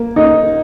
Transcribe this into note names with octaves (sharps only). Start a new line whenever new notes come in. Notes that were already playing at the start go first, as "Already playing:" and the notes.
Already playing: A#3
D#4